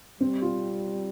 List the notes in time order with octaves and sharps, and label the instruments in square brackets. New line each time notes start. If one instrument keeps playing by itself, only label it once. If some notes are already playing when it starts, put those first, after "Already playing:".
[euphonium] G3 [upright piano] C4
[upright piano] F4